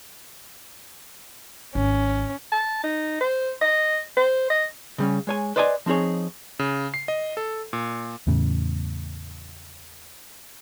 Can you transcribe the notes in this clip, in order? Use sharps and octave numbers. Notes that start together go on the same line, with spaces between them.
G#1 C#4
A5
D#4
C5
D#5
C5
D#5
C#3 G3 C#4
G#3 C#5 G#5
B4 C5 D5 D#5 G5 G#5
F3 C4 D#4 G#4 C#5
C#3
C7
D#5
A4
A#2
E2 A2 C#3